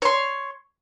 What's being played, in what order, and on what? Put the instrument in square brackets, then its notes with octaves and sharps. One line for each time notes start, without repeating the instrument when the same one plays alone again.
[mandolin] C#5 C6